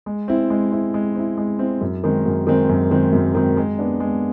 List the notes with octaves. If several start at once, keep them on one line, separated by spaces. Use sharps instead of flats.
G#3
C4 E4
G#3
C4 E4
G#3
C4 E4
G#3
C4 E4
F#2
D#3 G#3 C4
F#2
D#3 G#3 C4
F#2
D#3 G#3 C4
F#2
D#3 G#3 C4
G#3
B3 D4
G#3